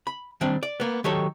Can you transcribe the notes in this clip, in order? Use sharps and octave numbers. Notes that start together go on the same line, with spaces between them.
B5
D#3 G3 C4 D4
D5
A#3 B3
D#3 F#3 G4 A4 C#5